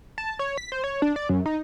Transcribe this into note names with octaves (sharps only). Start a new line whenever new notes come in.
A5
C#5
B6
C5
C#5
D4
D5
F#2
D#4